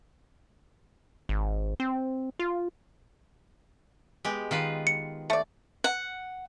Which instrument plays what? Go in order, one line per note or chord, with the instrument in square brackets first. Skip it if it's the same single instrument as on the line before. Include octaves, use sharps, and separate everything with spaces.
[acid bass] G#1
C4
F4
[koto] G#3 B3 G4
D#3 F4 B4
[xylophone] C#7
[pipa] A3 D5
[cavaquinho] F#5